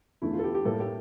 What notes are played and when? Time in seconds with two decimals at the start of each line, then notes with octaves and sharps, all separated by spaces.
0.22 E2 D3 A3 E4
0.33 F4
0.39 A4
0.44 G4
0.54 G4
0.65 A2 G3 A#3 A4
0.80 G4